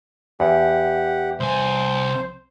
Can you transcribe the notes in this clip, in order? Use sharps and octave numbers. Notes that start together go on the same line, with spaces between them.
E2 G4 F#5
C2 C5 G#5